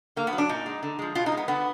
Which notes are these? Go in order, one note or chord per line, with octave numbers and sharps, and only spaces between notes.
D3 A#3
B3
F#3
D4
A#2 D#4
G#3
D3
F3 G#3
B2 F4
D#4
G#3
B3
D3 B3